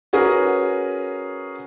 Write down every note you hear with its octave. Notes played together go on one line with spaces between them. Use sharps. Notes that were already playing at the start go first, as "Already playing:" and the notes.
C#4 F#4 G#4 A#4 B4